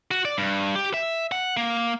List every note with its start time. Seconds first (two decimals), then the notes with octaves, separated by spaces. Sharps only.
0.11 F#4
0.25 D5
0.38 G2
0.75 G4
0.94 E5
1.32 F#5
1.57 A#3